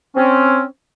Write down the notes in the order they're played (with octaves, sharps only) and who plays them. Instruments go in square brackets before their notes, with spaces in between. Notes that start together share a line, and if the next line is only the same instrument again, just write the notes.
[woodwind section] C4 C#4